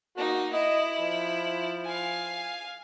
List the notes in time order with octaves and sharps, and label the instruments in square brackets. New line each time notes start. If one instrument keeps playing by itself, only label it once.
[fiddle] A#3 D#4 [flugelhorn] F#4
[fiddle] E4 [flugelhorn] D#5
[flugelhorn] F3
[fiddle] F5 G#5